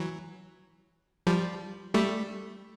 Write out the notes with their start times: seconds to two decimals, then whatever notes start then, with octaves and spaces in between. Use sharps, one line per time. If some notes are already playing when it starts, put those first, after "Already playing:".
Already playing: E3 F#3
1.27 F3 G3
1.94 G3 A3